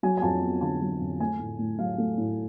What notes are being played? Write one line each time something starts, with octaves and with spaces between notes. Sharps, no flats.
F#3 G#5
G#5
F2 A5
B3
D3 A5
F#3
F2
A3 G#5
A2
A2
F#3 F5
A3
A2